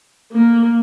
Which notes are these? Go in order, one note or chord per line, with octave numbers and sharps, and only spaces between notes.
A#3